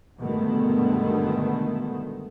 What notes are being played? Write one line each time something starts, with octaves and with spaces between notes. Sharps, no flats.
G2 B2 D3 D#3 G#3 A3